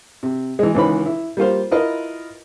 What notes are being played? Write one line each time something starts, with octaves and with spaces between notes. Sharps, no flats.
C3
E3 G#3
C#2 D#3 E3 C#4 B4 B5
E4
G3 A#3 F4 C5
E4 F4 A#4 B4 D#5